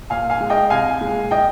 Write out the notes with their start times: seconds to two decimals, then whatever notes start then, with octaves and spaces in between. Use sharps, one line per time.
0.10 A#2 F5 G#5
0.30 F5 G#5
0.41 G#3
0.50 D#5 G5
0.70 C2 F5 G#5
1.01 A#2 G#3
1.31 D#5 G5